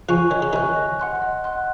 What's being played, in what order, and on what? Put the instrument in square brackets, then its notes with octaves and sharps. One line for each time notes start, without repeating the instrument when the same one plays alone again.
[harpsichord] C#3 F3 [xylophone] G#5 C#6 F#6
[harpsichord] D#3 [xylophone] C#5
[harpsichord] C#3
[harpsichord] C3 D#3 [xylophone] G#5 C#6 F#6
[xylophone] D#5
F#5 C6 F#6
D#5
F#5 C6 F#6